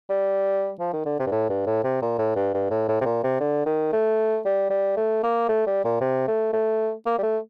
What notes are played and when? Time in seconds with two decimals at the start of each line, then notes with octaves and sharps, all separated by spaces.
0.10 G3
0.80 F3
0.93 D#3
1.05 D3
1.20 C3
1.27 G2
1.32 A2
1.50 G2
1.67 A2
1.84 C3
2.02 A#2
2.19 A2
2.36 G2
2.54 G2
2.70 A2
2.88 A2
3.01 C3
3.05 A#2
3.24 C3
3.40 D3
3.66 D#3
3.92 A3
4.45 G3
4.70 G3
4.97 A3
5.23 A#3
5.48 A3
5.66 G3
5.84 A#2
6.01 C3
6.28 A3
6.53 A3
7.06 A#3
7.18 G3
7.23 A3